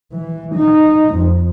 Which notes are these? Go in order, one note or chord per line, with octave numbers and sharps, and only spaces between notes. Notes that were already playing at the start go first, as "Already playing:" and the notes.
E3
D#4
F2